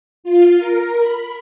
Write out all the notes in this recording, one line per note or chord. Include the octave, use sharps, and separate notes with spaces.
F4
A#4
B5